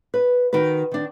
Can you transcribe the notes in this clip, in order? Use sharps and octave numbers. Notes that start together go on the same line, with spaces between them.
B4
D#3 D#4 F#4 B4
D#3 D4